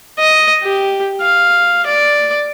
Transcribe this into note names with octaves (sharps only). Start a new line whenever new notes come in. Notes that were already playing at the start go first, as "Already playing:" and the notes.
D#5
G4
F5
D5